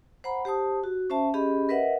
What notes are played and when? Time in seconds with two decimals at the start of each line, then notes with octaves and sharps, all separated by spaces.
0.24 C5 F#5 A#5 B5
0.45 G4 C5 A5 D#6
0.84 F#4
1.10 C#4 C5 E5 A5
1.34 C#4 G4 G#4 D#5 B5
1.69 A#4 B4 D#5 E5 F#5